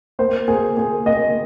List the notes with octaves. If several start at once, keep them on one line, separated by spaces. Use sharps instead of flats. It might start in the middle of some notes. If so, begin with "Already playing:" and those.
A#3 C5
A#3 G#4
A#3 G#4
A#3 D#5